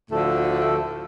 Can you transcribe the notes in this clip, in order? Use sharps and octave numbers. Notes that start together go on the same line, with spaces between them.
D2 A2 D3 F3 A3 A4